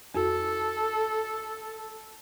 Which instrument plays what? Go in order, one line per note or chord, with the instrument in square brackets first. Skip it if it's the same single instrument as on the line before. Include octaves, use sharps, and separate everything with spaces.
[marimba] F2 F#4 [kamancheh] A4